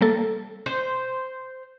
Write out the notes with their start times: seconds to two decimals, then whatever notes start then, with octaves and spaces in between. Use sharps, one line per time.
0.01 G3 A#3 A4
0.66 C5